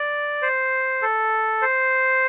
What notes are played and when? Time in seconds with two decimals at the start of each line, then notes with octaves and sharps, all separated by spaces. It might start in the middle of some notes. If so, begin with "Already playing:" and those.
Already playing: D5
0.42 C5
1.02 A4
1.62 C5